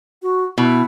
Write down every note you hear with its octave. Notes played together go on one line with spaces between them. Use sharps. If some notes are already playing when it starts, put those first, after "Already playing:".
F#4
B2 E4